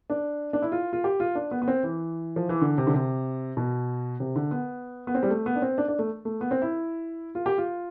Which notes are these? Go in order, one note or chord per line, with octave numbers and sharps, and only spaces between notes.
D4
D4
E4
F4
F4
G4
F4
D4
B3
B3
C4
E3
F3
E3
D3
C3
D3
C3
B2
C3
D3
B3
B3
C4
G3
A3
B3
D4
C4
D4
D4
A3
A3
B3
C4
E4
F4
G4
F4